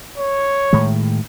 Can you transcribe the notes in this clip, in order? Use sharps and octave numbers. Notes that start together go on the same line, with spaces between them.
C#5
A2 D#3 G#3